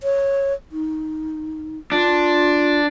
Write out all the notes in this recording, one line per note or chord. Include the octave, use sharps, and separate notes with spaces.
C#5
D#4
D4 F4